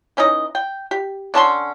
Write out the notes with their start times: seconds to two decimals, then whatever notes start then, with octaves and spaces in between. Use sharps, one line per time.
0.17 E3 C#4 D#4 D#5
0.55 G5
0.91 G4
1.34 D3 C#4 A5 C6